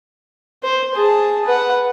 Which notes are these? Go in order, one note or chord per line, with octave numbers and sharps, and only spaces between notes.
C5
G#4 A5
B4 F#5